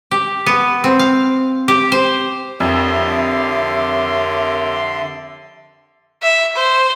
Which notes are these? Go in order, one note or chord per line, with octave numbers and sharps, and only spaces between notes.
G4
B3
C4
F5
G4
C5
F2 D3 G4 A#4 C#5 E5 C6
E5
C5